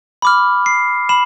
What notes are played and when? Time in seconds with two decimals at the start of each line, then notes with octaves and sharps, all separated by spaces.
0.22 B5 D6 F6
0.66 C7
1.09 B5 E7